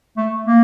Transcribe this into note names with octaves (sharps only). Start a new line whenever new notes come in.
A3
A#3